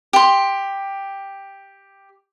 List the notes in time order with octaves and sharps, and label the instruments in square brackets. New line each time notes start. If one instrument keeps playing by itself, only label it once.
[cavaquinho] G4 C6